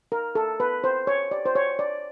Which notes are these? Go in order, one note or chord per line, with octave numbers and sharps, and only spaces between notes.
A#4
A4
B4
C5
C#5
D5
C5
C#5
D5